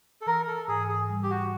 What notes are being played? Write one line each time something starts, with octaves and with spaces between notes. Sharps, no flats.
A4
E3 A#4
A4
G#2 G#4
G#4
G3
G4
F#4